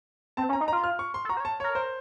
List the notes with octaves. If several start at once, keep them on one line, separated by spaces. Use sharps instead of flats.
C4 A5
C#4
A#5
D#4
F4 A#5
F6
C#6
C6
A4
F#4 A#5
C5
C#5
A5
A#4 C#5
C5